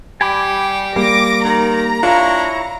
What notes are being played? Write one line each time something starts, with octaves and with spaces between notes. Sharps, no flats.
G3 G4 G#5 B5 D6
G3 A#3 D6 A#6
D#3 A#5
D4 E4 F4 C#5